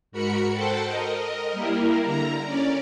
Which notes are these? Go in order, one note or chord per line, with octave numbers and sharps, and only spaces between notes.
G#2 F#4 A#4 B5 C#7
A4 C5 F#5 G5 A5
A#4 D#5
G3 A#3 E4 A#4
D3 A#5
C#4 D5